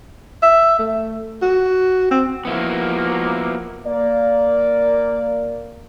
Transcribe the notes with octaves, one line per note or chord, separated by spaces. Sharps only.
E5
A3
F#4
C4
F3 A#3 B3 E4 F#4
A#3 D5